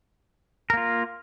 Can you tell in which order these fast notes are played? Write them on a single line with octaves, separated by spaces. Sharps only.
A#4 A#3 F4